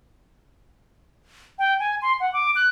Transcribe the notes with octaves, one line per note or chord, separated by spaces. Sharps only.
G5
G#5
C6
F#5
D6
F#6